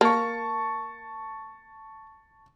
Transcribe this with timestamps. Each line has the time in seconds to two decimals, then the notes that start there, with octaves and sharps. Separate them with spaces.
0.01 A#3 A5 C#6